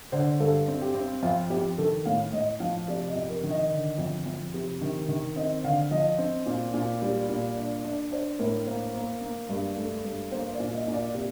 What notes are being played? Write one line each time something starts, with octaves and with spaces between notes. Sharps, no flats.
D3 C5
G2 A4
C4
G4
C4
F2 F4
F2 G4
D#3 A4
A2 F5
A2 D#5
F3 F5
C3 D5
D#5
F2
A#4
D#3
D#5
D3
F2
F2
C3
D#3
D#3
C4 D#5
D3 F5
F3 D#5
C4
A#2
A#2
G3
A#2
D4
D4 D5
D4 C5
A2 A#4
A#3 C5
A#3
A#3
G2
A3
G2
A#3 C5
D5
A#2
D#5
A#2
D5
C3